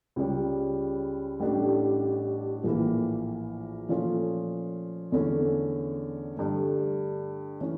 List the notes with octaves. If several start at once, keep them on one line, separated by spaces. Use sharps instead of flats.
C#2 C#3 G3 C#4
A1 A2 G3 D4 G4
A#1 A2 E3 A#3
A#2 F3 A3 C#4 F4
E2 D3 A3 C#4
G2 D3 A3
E3 A3 C#4